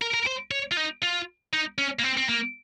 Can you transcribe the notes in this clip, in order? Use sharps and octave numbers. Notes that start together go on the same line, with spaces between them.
A#4
A#4
C5
C#5
F4
D#4
F4
D#4
C#4
A#3
C4
C4
A#3